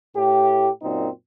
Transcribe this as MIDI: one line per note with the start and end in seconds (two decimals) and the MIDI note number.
0.16 0.70 45
0.16 0.70 67
0.82 1.09 42
0.82 1.09 46
0.82 1.09 60
0.82 1.09 63